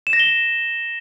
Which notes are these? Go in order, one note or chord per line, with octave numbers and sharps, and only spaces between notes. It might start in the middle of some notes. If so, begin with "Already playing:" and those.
E7
A#6
G7